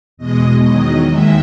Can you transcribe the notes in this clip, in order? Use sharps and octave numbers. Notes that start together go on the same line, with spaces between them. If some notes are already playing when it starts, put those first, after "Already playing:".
E2 B2 G#3 D#5
E2 D#3 F#3 D#5
D#2 D#3 G#3 E5